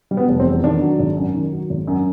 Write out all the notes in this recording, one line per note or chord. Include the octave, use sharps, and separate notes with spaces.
G3
B3
F1
C4
E2
D#3 D4
F#3
G#1
F#2
D#3
F#3
G#1
F#2